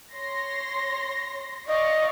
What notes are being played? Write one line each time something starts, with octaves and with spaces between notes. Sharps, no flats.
C#5 C6 A#6
D5 D#5 F5 C#6